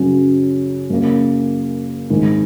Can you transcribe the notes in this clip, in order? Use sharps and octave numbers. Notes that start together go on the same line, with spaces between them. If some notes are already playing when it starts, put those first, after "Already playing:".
Already playing: F#2 C#3 F#3 C#4
F#2 C#3 A#3
G#1 G#2 D#3 G#3